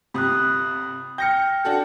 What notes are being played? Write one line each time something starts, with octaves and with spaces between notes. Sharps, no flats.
G1 C3 B5 D#6 F#6
G5 F6 G6 A#6 C#7
D4 F#4 A4